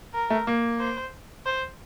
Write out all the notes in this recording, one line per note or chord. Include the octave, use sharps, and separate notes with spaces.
A#4
A3
A#3
C5
C5